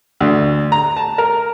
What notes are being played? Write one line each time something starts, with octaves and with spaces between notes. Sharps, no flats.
D2
A#5
A5
A#4